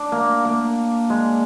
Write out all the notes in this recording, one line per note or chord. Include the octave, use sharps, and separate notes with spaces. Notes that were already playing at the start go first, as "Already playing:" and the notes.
Already playing: D4
A#3
A#3
G#3